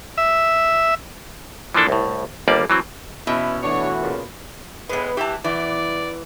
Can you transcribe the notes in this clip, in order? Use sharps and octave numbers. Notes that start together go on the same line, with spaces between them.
E5
E3 F3 A#3 D4 A4
C2 A2
G1 D#2 G3 A#3 D5
E3 F#3 C4
B2 E3 C#4 E4
E3 A3 D4 F#4 C#5
A#2 C#3
A2 G#3 B3 B4
E3 G4 A5
E2 E3 D5